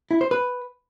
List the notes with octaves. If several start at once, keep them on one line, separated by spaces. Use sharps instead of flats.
E4
C5
B4